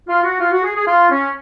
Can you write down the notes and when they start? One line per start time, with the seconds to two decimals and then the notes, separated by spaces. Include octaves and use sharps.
0.08 F4
0.24 F#4
0.40 F4
0.52 F#4
0.63 G#4
0.75 G#4
0.87 F4
1.10 C#4